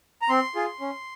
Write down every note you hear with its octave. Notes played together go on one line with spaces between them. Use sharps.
A#5
C4 C6
F4 G#4
C#4